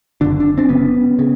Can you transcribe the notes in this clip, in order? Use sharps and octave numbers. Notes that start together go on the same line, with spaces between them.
F#1 F#2 D3 D4
D4
C4 D4
F#1 F#2 C#3 B3 C#4
C#3